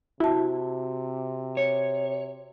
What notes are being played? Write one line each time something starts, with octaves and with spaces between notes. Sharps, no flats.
C3 E4 F#4 A5
C#5